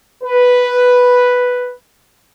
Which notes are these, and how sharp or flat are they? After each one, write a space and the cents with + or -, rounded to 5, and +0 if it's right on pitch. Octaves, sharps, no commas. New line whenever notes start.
B4 +0